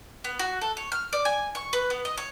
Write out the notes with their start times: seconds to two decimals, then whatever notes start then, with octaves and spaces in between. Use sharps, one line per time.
0.24 B3
0.39 F#4
0.61 A4
0.77 C#5
0.92 F6
1.13 D5
1.25 G#5
1.55 C#6
1.73 B4
1.90 B3
2.05 D#5
2.17 C#5